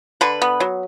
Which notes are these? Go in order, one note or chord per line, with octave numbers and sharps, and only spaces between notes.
D3 B4
B3
F#3